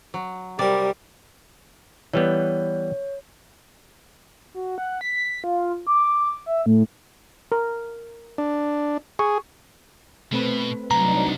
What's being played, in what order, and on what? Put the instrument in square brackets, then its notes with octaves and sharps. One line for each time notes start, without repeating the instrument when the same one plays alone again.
[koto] F#3
[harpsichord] C3 A#4 [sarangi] G3 [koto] D5
[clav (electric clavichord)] E3 G3 B3 [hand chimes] C#5
[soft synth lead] F#4
F#5
B6
F4
D6
E5
A2
[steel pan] A#4
[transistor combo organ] D4
[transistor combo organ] G#4 [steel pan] C#6
[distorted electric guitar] B2 [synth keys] A3 C4 B4
[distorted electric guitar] C2 [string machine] F#3 D4 D#4 [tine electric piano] A#5